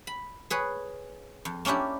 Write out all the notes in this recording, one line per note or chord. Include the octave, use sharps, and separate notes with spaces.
B5
G#4 B4 C#5
F2
A#3 C#4 D4 E4 G4